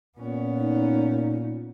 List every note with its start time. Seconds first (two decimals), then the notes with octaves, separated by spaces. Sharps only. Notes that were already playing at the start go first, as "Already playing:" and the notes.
0.18 A#2 B3 C#4
0.58 D#4